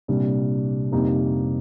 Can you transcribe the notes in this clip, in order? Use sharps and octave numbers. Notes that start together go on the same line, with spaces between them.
C2 A#2 G3 D4
F2 C3 G3 A#3 D#4